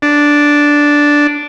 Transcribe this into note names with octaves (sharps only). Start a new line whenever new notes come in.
D4